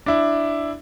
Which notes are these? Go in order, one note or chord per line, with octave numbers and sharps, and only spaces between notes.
D4 E4